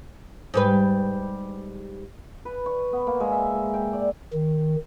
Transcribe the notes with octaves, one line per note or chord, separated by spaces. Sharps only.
G#2 G3 B4
B4
C#6
B3
A#3
G#3
E5
G#3
G5
D5
D#3